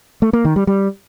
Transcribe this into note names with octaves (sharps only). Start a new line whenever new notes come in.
A3
A#3
D#3
G3
G3